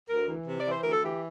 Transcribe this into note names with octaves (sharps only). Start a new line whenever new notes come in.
D2 A#4
E3
C3
D5
E3 C5
D2 A#4
A4
E3 G4